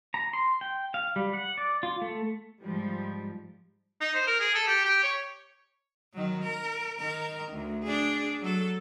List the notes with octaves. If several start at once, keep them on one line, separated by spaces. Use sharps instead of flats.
A#5
C6
G5
F5
G3
F#5
D5
F4
A3
G#2 F3 G3
D#4
C5
A#4
G#4
A4
G4
G4
C#5
D#3 F#3
A#4
D#3 A#4
D2
D4 G#4
F#3 A4